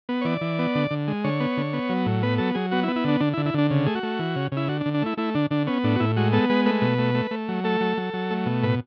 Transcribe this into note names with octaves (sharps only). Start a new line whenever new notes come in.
B3
C#5
E3 D5
E3
B3
D3
D3
G#3
D3 C#5
B3
D3
B3
F#3
A2
B3 B4
F#3 A4
F#3 G#4
B3 F#4
E4
B3
E4
D3 D4
D3 D4
E4
D3
E4
D3 D4
C#3
A3 G#4
F#4
A3
E3
C#3
C#3 E4
D3 F#4
D4
D3
D4
A3 E4
A3 E4
D3 D4
D3 D4
B3 C#4
A2 D4
F#4
A2 E4
G#3 F#4
B3 A4
G#3 B4
A3 B4
B2
A3
A3
A3
F#3
A3 A4
F#3
F#3
F#3
A3
B2
A2 B4